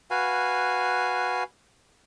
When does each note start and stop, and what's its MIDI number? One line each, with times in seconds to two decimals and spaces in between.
0.11 1.43 66
0.11 1.43 71
0.11 1.43 77
0.11 1.43 80